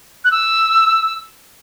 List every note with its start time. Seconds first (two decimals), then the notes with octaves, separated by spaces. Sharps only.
0.25 F#6
0.31 E6